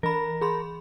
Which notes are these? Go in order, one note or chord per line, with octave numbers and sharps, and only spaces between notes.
E3 A#4 B5
G#4 B5 C6